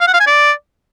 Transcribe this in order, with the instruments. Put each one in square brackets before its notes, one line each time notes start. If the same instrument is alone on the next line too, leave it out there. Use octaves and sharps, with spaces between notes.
[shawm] F5
F#5
F5
G#5
D5